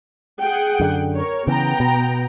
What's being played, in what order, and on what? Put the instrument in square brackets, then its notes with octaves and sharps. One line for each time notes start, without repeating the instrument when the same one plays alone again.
[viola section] G#4 F#5 G5
[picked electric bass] F#2 D3
[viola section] A#4 C#5
[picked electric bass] C#3 E3 [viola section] B3 G5 A#5
[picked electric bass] B2